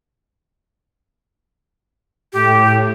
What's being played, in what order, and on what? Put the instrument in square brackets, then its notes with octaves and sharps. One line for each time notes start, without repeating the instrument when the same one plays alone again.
[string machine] A2 [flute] G4